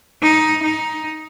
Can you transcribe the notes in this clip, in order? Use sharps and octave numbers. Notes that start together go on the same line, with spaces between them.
D#4
D#4